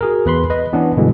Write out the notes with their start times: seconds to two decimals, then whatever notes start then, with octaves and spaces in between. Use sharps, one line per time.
0.01 F#4 G#4 A#4
0.26 E2 B4 B5 C6
0.50 B4 D#5
0.73 E3 B3 C#4 D4
0.97 G2 B2 D3 E3 G#3